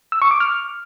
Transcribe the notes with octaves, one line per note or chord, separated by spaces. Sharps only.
E6
C#6
D6
F6